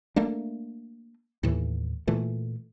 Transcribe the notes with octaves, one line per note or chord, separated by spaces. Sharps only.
A3 A#3 D4
D#2 A2 E3
A#2 E3 A3